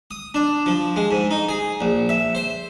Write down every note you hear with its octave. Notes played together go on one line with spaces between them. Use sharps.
D#6
D4
F3
G#3
G#2
D#4
G#4
A#1
E5
C5